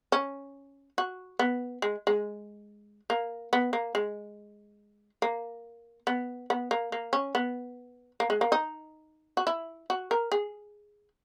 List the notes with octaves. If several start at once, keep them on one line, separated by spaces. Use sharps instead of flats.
C#4
F#4
B3
G#3
G#3
A#3
B3
A#3
G#3
A#3
B3
B3
A#3
A#3
C#4
B3
A#3
G#3
A#3
D#4
F#4
E4
F#4
A#4
G#4